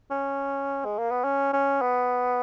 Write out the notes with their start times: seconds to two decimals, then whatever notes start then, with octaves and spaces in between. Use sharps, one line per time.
0.11 C#4
0.85 G#3
0.98 A#3
1.11 B3
1.24 C#4
1.53 C#4
1.82 B3